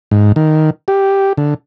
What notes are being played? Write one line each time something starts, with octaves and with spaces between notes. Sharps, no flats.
G#2
D#3
G4
D3